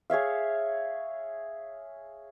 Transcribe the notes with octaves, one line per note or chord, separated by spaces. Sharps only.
G#4 C#5 E5 F5